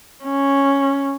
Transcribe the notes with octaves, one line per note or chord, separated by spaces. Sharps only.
C#4